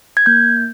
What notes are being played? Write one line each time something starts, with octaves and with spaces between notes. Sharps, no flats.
G#6
A#3 G6